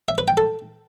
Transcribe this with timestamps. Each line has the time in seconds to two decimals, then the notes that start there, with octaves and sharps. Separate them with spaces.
0.08 E5
0.18 B4
0.28 G5
0.37 A4